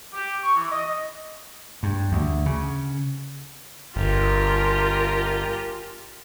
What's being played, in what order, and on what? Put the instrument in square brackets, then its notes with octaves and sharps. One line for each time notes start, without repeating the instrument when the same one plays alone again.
[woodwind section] G4
C#6
E3
D#5
[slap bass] G2
D2
C#3
[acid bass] G1 [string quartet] F4 G4 A#4